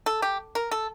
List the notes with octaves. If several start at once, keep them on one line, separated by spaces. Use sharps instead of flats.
A4
G4
A#4
A4